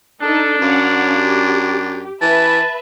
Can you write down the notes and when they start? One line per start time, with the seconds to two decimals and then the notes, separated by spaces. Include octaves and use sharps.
0.22 D4 D#4 A4
0.62 F#2 C#4 F5 F#5
1.18 G4
2.22 E3 B4 E5 A5